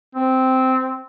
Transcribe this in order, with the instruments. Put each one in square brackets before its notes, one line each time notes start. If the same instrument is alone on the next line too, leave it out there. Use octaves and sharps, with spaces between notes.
[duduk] C4